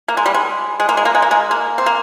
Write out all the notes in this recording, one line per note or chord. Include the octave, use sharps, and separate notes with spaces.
A#3
G#3
G3
G#3
G#3
A#3
G#3
A#3
G#3
A#3
G#3
A#3
C4
A#3